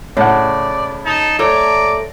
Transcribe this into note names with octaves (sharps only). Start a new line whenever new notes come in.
A2 C#3 D5 F#5
D#4 A5
A3 A4 C#5 D5 A#5